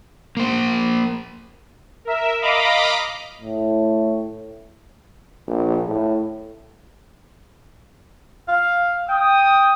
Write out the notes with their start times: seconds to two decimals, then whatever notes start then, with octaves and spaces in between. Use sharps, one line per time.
0.37 A#3 C5
2.05 A#4 E5
2.42 D#5 F5 A#5 B5 D6
3.41 A2
5.47 A#1
5.86 A2
8.48 F5
9.09 G5 D#6